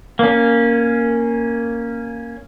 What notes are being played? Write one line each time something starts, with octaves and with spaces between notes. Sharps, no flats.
A#3 C#4